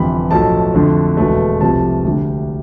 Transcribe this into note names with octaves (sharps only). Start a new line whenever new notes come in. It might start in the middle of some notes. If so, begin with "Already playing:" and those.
Already playing: G1 F2 C3 E3 G3 B5
B1 A2 F3 A3 A5
F2 D3 A3
E1 E2 B2 A3
C2 C3 F3 A3 A5
D2 D3 G3